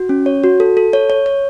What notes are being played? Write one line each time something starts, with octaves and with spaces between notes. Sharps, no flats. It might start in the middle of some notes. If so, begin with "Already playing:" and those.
Already playing: F#4
C#4
C#5
F#4
A4
A4
C#5
C#5
C#5